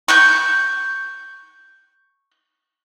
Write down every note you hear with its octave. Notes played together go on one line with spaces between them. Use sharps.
C#6 F#6 G6